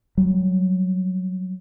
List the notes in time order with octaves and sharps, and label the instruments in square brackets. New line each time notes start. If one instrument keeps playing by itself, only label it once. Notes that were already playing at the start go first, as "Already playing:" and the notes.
[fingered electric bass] F#3 G3